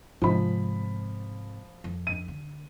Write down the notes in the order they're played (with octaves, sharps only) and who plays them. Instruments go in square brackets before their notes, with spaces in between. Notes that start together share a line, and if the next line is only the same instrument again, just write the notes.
[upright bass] G#2 C3 [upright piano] F3 B5
[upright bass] F2
[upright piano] D#7
[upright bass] D3